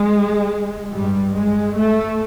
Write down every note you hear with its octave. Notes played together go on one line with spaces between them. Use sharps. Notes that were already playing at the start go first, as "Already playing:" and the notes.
Already playing: G#3
G2 G3
G#3
A3